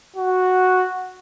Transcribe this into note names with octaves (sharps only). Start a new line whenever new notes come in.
F#4